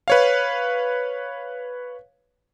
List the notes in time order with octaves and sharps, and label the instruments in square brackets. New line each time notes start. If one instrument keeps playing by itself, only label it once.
[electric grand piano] B4 C#5 F5